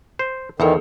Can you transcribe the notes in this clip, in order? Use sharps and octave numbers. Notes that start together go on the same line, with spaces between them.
C5
E2 D#3 B3 G#4 A4